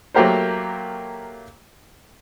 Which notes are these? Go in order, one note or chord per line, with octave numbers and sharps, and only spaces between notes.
F#3 A3 A#3 G4 A#4 C5